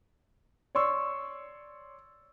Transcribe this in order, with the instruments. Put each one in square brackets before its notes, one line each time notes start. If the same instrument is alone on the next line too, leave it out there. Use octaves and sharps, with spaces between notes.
[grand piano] C#5 D5 C6 C#6 E6